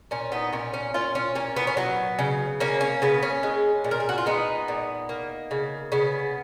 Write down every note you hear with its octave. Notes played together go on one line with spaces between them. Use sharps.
A#2 C#4
B3 D#4
A#2 C#4
C#4
A#2 C#4 F4
C#4
A#2 C#4
B3
C#4
F#3 B3
C#3
A#3 C#4
C#4
C#3 B3
C#4
G#3
A#2
A#4
G#4
F#4
F4
G#3 B3 D#4
A#2
A#3
C#3
C#3 B3